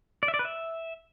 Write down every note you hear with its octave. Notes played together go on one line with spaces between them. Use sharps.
D5
E5
D5
B4
E5